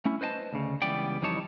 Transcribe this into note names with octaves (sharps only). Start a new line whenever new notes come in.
A3 C#4 E4
B4 C5 D#5 G#5 A5
D2 C#3
C#2 E3 G3 B3 D5 G5
F2 E3 G3 D#4 C#5 A5